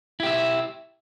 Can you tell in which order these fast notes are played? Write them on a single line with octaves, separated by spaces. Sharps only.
E4 G4 E5